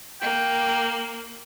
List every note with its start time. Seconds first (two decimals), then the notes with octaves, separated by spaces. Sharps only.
0.21 A#3 G5